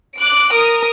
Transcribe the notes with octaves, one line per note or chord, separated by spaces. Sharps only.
D6 F#6 D7
A#4 D#6